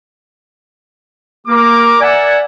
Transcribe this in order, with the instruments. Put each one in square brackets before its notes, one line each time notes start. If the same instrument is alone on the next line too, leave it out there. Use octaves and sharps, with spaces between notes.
[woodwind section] A#3 [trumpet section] G4 A#4 D6
[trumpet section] A#4 E5 F#5 [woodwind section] D5 G#5